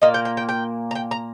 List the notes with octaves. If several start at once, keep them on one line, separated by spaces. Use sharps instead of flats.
A#2 A#3 D#5
G5
G5
G5
G5
A#5
G5
A#5